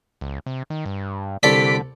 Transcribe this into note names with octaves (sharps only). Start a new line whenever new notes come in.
C#2
C3
D#3
G2
C2 D3 A4 D5 B6 D7